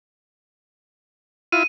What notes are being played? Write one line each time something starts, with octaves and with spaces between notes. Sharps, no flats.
E4 F4 D#7